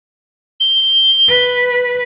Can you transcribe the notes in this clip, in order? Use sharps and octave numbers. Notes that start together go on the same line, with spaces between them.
G7
B4